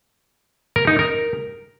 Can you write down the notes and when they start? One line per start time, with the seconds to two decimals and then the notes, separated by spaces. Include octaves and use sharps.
0.76 A#4
0.87 D#4
0.99 A#4